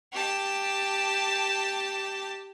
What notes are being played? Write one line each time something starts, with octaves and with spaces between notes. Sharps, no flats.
G4 A5